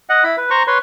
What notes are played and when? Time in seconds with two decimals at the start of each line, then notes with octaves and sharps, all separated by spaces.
0.09 D#5 F#5
0.24 E4 B5
0.37 B4
0.50 C5 A#5 C#6
0.67 B4 C#5 C6